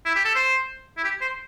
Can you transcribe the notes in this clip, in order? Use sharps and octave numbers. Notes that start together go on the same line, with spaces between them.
E4
G4
A4
C5
E4
G4
C5